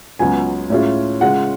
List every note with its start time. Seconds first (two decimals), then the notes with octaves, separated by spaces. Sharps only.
0.19 C#2 C#3 F#3 B3 F4 G#5
0.70 A2 G#3 C#4 F4
1.21 C#3 G#3 C#4 F4 F#5